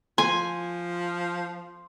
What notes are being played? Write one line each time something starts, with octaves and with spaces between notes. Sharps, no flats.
F3 G#5 C6